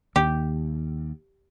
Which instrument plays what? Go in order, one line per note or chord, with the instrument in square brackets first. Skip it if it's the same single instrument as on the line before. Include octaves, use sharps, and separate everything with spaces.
[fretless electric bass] D#2 [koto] G4